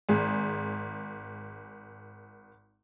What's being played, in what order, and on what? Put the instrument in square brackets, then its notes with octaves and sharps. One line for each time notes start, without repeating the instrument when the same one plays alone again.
[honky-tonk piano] G#1 G#4